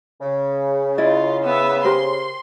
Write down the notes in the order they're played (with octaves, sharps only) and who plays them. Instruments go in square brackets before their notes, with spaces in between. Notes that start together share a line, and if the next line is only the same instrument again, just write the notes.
[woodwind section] C#3
[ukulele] E4 D5 D#5 [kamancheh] F4
[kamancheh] B3 E5
[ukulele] G4 A#4 C5 [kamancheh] C6